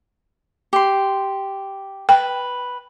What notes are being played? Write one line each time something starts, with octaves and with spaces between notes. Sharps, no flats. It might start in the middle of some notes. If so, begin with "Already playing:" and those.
G4 C6
B4 G5